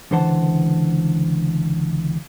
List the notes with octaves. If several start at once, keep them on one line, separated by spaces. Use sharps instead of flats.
C#2 D3 E3 C5 F#5 A5